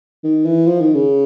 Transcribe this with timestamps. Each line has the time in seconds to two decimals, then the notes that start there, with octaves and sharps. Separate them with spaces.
0.24 D#3
0.45 E3
0.67 F3
0.81 D#3
0.95 C#3